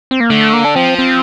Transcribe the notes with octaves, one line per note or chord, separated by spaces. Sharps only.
C4
A#3
D3 A3
A#3
D4
F3 C4
C4